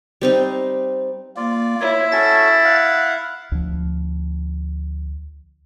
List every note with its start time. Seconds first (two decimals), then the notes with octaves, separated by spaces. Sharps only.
0.21 G3 C4 D#4
1.37 A#3 F4 D5
1.81 E4 C#5
2.12 C#4 F#4 A4 A6
2.65 F5 F#5
3.52 D2 F3